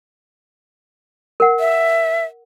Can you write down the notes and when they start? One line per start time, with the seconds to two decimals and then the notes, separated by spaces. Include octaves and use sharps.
1.40 A#4 F#5
1.60 E5